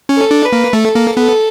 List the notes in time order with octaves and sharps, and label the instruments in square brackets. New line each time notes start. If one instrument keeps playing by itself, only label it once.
[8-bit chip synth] C#4
[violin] A4
[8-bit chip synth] D4
[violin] B4
[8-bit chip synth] A#3
[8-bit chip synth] A3 [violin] A4
[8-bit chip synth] A#3
[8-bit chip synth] B3 [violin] A4